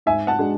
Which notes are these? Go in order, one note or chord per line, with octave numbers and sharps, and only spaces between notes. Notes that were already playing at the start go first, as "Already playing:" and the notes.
G#2 E5 G#5
F#5 A5
G#3 D4 F#4